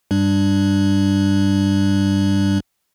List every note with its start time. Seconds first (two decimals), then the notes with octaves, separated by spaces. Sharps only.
0.11 G2 G3 D4